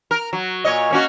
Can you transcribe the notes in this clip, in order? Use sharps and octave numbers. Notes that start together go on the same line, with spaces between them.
A#4
F#3
A#2 C#5 D#5
A#3 C#4 F#4